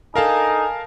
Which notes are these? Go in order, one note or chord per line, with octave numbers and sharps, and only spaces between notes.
D4 D#4 A4 A#4 F5 G#5 A5